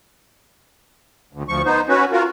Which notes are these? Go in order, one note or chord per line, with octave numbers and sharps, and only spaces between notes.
D2
D2 F3 C#6
B3 D#4 C5
C#4 F#4 B4
F4 F#4 A#4